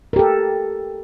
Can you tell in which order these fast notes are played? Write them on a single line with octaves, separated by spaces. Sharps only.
A#4 G4 A4